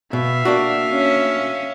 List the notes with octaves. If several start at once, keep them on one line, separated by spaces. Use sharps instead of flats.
B2 E5 F5
A#3 D4 F#4
C#4